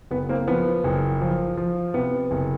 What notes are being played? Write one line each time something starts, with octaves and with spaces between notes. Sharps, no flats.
F#1 B3
A#3 C4
F3 B3
F#1
F3
F3
C3 B3
F#1